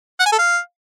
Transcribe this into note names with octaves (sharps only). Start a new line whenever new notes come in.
F#5
G#5
A4
F5